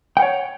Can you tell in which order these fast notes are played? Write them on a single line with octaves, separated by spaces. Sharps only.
G5 F#5 C#5